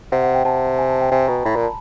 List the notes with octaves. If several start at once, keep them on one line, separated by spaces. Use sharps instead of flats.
C3 F#5
F#5
G5
C3 A5
G#5
A5
G5
C3 G#5
B2 A#5
A2 B5
A#2 A#5
A5